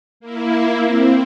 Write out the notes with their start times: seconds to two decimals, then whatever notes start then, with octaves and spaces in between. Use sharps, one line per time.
0.20 A#3 E4
0.84 C4